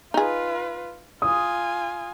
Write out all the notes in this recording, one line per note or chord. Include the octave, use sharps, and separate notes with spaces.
D#4 F4 G#4 B4
F4 G#5 D#6